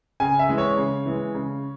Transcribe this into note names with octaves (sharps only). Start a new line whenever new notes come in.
C#3 G#5
E5
E3 G#3
C#5
C#3
E3 G#3
C#3